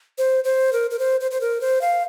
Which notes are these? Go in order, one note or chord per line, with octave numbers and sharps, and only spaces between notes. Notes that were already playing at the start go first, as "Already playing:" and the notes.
C5
C5
A#4
A#4
C5
C5
C5
A#4
C5
F5